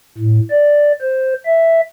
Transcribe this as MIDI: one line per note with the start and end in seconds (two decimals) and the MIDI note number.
0.18 0.40 45
0.50 0.92 74
1.01 1.33 72
1.46 1.81 76